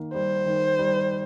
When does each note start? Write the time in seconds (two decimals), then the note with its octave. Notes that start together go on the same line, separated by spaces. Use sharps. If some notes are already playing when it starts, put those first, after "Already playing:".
Already playing: D#3 A#3
0.13 G3 C5
0.46 D#3
0.79 G3